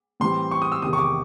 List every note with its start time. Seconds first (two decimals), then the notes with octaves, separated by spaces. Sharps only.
0.20 A2 E3 G3 C4 C6
0.51 C#6
0.62 D#6
0.72 E6
0.82 E2 C3 D#3 D#6
0.93 C#6
0.98 D6